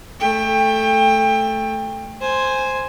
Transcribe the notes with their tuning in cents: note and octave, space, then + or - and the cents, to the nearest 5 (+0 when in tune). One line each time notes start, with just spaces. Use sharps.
A3 +0 G5 +25
C5 +0 G#5 +0